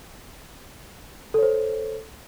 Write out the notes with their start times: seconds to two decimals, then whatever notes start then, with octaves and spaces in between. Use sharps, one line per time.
1.34 A4
1.38 C#5
1.43 C5